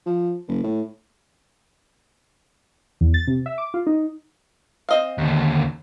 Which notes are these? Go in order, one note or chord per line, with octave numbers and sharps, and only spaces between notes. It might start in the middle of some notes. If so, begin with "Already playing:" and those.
F3
F#1
A2
E2
A6
C3
E5
D6
F4
D#4
C4 D#5 F5
D#2 D3